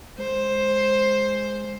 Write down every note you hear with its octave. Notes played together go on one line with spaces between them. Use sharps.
G#3 C5